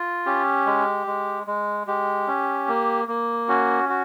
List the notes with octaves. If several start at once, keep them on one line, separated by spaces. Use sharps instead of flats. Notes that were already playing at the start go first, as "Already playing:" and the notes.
Already playing: F4
C#4 G4
G#3
G#3
G#3
G#3 G4
C#4
A#3
A#3
C#4 F#4
F#4